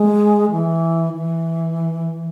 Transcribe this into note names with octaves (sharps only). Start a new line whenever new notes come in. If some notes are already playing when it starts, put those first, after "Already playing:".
Already playing: G#3
E3
E3